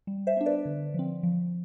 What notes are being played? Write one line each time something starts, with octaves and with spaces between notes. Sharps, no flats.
G3
C5 E5
B3 D4
B4 D5
D3
F3 C4
F3